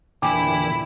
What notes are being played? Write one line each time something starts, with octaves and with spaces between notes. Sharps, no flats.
E2 A#2 D3 E4 G5 G#5 D6